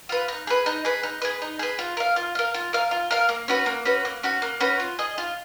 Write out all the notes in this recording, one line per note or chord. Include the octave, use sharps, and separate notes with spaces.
F4 B4
D#4
G#4 B4
D#4
G#4 B4
D#4
G#4 B4
D#4
G#4 B4
F4
A#4 F5
F4
A#4 F5
F4
A#4 F5
F4
A#4 F5
A#3
C#4 F#4 B4
A#3
C#4 F#4 B4
A#3
C#4 F#4 B4
A#3
C#4 F#4 B4
F4
G#4 D#5
F4